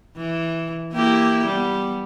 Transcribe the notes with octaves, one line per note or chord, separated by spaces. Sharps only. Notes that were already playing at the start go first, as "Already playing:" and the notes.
E3
A#3 E4 G4
G3 B3